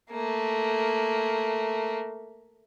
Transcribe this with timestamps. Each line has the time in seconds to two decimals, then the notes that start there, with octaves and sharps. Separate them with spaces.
0.10 A3 A#3